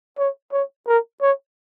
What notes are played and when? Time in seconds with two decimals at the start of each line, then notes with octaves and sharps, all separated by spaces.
0.18 C#5
0.52 C#5
0.87 A#4
1.21 C#5